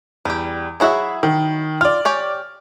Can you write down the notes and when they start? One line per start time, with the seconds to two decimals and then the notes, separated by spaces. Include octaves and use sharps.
0.25 E2 G3 G4
0.80 F#3 E4 F#4 G#4 E5
1.23 D#3
1.81 F4 D5 F6
2.05 G4 C#5 G#5